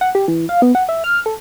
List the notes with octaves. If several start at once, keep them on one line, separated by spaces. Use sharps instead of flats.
F#5
G4
E3
F5
B3
F#5
E5
F6
A4